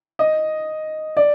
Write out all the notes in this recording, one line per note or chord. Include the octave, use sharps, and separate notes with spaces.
D#5
D5